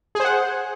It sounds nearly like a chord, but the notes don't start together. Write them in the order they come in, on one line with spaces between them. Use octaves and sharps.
G#4 C5 F#5